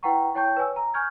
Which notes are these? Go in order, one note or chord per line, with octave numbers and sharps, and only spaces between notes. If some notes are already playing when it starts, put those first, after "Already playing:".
E4 B4 F#5 G5 A#5 C#6
E4 C#5 G5 A5 C#6 G6
B4 C#5 G#5 E6
A#5
G#5 C#6 F6 G6 G#6